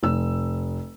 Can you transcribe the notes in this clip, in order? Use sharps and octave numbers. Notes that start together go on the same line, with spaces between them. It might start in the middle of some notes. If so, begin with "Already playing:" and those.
F1 E6